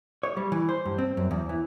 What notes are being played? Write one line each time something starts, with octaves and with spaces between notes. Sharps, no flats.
C#5
G3
E3
C5
G2
C4
F#2
E2
E3